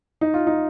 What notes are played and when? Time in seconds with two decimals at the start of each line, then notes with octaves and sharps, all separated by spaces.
0.21 D#4
0.34 F4
0.47 D#4